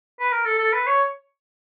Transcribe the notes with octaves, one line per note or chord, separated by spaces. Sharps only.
B4
A#4
A4
A4
B4
C#5